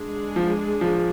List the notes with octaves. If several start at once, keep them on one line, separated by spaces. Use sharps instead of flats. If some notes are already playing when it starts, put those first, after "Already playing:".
Already playing: G#3 D4 G#4
F3
F3